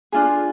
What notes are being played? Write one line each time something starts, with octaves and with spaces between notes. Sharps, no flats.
D4 F4 G#4